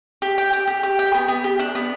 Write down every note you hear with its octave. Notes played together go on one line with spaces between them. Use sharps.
G4
G5
G4
G4
G4
G5
B3
B3
G4
D4
B3